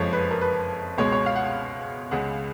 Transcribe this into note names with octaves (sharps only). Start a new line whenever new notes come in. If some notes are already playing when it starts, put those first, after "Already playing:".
Already playing: F#1 F2 F3 G#3 C#5
B4
A#4
B4
C#2 B2 G#3 C#5
C#5
F5
F#5
C#2 C#3 G#3 F#5